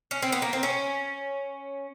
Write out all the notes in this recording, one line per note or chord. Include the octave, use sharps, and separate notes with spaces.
C#4
C4
B3
A#3
C4
C#4